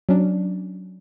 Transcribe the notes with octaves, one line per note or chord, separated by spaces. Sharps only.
F#3 C#4 D4